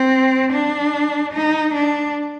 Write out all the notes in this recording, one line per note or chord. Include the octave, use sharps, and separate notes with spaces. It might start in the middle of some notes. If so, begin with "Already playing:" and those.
Already playing: C4
D4
D#4
D4